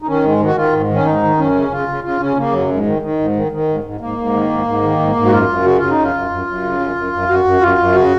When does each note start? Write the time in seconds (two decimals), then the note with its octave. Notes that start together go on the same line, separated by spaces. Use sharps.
0.02 D#4
0.07 D#3 C#4
0.23 G#2 G#3
0.40 D#3
0.45 F#4
0.56 D#3 F4
0.72 G#2
0.89 D#3
0.94 C#4
1.06 G#2 D#4
1.23 D#3
1.38 F#2 C#4
1.55 C#3
1.71 C#3 F4
1.88 C#3
2.04 C#3 F4
2.20 C#3 C#4
2.37 C#3 A#3
2.53 F#2 F#3
2.70 G#2
2.86 D#3
3.02 D#3
3.19 G#2
3.35 D#3
3.52 D#3
3.68 G#2
3.84 G#2
4.01 G#2 A#3
4.18 G#2
4.34 D#3
4.50 G#2
4.66 G#2
4.83 D#3
4.99 G#2
5.15 G#2
5.26 F#4
5.32 F#2 F4
5.49 F#2
5.64 C#3 F#4
5.78 C#3 F4
5.90 D#4
5.98 F#2
6.03 F4
6.14 F#2
6.30 F#2
6.47 F#2
6.63 C#3
6.80 F#2
6.96 F#2
7.13 F#2
7.28 F#2 F#4
7.44 F#2
7.61 F#2 F4
7.78 F#2
7.94 C#3 F#4